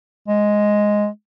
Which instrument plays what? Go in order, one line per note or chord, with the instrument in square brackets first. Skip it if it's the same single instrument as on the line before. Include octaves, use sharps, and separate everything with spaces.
[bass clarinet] G#3